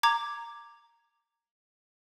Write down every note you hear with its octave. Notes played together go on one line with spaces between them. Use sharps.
A#5 D6 G#6